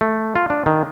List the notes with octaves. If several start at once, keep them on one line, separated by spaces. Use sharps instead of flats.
A3
F4
D4
D#3